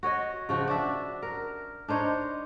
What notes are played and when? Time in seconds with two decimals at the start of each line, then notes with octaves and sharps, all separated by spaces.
0.03 F#4 C#5 D#5
0.49 C#3 F3 F#4
0.68 D4 F#4 E5
1.23 A#4
1.88 D4 D#4 C5 C#5